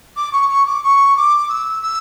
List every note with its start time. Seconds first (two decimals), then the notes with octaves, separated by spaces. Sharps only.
0.16 D6
0.32 C#6
0.49 C#6
0.66 D6
0.83 C#6
1.16 D6
1.49 E6
1.82 E6